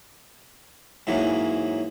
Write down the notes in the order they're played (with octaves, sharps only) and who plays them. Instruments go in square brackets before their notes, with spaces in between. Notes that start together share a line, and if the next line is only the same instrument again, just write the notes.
[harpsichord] G#2 E3 F#3 A#3 C#4